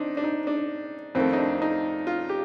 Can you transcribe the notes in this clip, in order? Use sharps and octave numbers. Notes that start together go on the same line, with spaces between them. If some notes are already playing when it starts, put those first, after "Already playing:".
Already playing: C4 D4 D#4
D4
D#4
D4
F2 D#3 A3 C4
D#4
D4
D#4
F4
G4